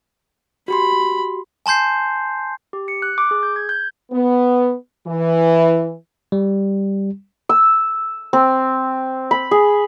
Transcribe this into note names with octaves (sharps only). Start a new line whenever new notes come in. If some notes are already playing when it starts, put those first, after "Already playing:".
F#4 G4 B5 C6
G#5 A5 C6 G6 C7
G4
C#7
F#6
D6
G#4
G6
G#6
G6
B3
E3
G3
E6
C4
B5
G#4